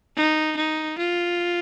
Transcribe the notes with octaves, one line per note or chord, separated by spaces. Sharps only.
D#4
D#4
F4